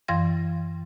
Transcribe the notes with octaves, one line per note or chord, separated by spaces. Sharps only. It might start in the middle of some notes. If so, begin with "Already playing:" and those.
F#2 E3 F5 C6 G#6 A#6